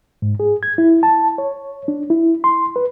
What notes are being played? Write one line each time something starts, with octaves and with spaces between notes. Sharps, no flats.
G#2
G#4
G#6
E4
A5
C#5
D4
E4
C6
B4